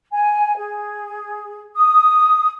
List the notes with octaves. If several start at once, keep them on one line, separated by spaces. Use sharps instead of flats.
G#5
G#4
D#6